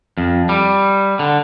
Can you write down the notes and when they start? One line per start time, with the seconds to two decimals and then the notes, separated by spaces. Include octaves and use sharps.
0.18 F2
0.49 G3
1.19 D3